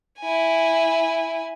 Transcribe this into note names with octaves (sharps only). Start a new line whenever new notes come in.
E4 G#5